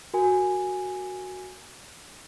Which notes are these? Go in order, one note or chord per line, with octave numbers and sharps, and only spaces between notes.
F#4 A#4 G#5